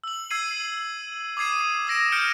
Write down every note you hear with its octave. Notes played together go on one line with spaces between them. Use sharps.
E6 F#7
E6 G#6 C7 D#7
D6 D#6 G#6 C7 D#7
D#6 E6 A#6 D7 E7
F6 G6 C#7 D7